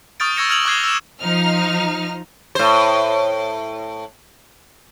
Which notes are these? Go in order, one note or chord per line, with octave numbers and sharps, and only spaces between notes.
C#6 D#6 F6 G6 A6 D7
C#6 E6 G#6 A#6 C#7 E7
E6 F6 G#6 A6 F7 F#7
C#6 D6 F#6 G#6 C7 G7
E6 E7
F3 D#4 F6
A2 C5